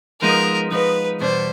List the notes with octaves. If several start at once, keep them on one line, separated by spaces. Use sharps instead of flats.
F3 G#3 B3 D#4 A#4
F3 G#3 B3 D#4 B4
E2 B2 G3 B3 D4 C5